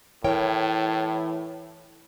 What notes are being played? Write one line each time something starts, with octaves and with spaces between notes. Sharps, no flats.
A2 E3 A#4 C#5 G5